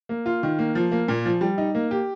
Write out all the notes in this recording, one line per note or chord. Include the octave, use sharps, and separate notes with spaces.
A#3
F4
D#3
A#3
F3
A#3
A#2
F3
G3
D#4
A#3
G4